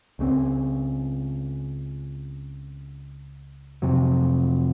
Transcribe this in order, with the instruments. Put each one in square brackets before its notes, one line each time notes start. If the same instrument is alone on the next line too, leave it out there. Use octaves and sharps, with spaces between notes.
[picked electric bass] C#2 C#3 F#3 C4
F2 C3 F#3